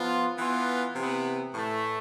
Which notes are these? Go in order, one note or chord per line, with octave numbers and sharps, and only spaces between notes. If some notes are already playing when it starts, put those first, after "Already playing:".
Already playing: F3 B3 F4
E3 B3 F4
C3 E3 B3
A2 E3 A3